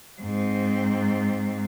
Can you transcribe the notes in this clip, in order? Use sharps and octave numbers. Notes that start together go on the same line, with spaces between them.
G#2 C4